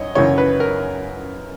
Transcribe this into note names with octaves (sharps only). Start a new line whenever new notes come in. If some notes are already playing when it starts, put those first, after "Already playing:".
Already playing: F#2 C#5 D#5
F#2 C#3 E3 C#5
B4
A#4